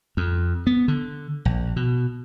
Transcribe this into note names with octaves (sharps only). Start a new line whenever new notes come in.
F2
B3
D3
A#1
B2